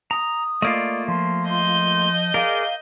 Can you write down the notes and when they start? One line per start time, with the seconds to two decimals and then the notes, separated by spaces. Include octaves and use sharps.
0.11 A#5 D#6
0.62 A3 A#3 F4 D5 D#5
1.08 F3 C6
1.49 D#5 C6 G6
2.34 G#4 A#4 D5 F5